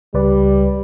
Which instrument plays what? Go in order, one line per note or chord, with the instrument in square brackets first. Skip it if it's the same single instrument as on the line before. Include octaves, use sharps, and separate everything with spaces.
[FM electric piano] C#2 B4 D5 [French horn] G3